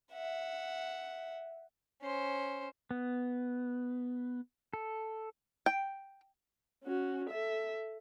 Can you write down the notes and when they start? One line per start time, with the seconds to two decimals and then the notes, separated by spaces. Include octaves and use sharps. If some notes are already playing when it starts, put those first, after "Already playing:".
0.12 E5 F#5
2.02 C#4 C5
2.91 B3
4.73 A4
5.66 G5
6.84 C#4 F#4
7.30 A4 E5